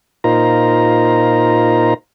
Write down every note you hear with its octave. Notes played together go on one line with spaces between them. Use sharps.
A#2 D#4 F4 A#4 C5 A#5